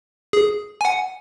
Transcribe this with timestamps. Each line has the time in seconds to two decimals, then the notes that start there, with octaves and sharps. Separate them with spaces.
0.33 G#4
0.81 G#5
0.85 F#5